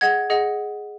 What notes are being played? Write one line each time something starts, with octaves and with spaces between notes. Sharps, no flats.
G#4 D#5 F#5 G#6
G#4 D#5 F#5